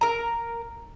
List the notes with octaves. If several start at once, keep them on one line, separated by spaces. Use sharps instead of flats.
A#4 A#5